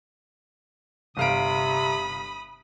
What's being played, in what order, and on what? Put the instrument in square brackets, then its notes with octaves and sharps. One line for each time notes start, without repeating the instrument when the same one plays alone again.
[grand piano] G1 F5 D7 [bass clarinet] C3 [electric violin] B5 D#6